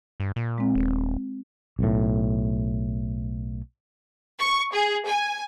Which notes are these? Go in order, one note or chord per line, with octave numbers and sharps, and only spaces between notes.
G2
A#2
G#3 C4
D#1
B1 A2
C#6
G#4
G#5